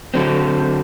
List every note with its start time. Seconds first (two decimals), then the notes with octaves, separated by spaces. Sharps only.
0.14 D3 F#3 C4